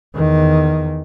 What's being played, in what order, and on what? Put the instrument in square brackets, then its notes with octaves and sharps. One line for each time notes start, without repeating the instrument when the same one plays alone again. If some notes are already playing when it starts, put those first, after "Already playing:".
[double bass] E2 D#3